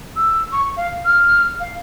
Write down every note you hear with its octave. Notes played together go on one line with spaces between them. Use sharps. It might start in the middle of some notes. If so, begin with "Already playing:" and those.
E6
C#6
F5
F6
F5